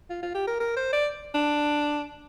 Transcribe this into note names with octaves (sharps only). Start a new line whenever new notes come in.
F4
F4
G4
A#4
A#4
C5
D5
D4